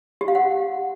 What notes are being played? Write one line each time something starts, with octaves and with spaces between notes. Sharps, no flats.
G4
F5
F#5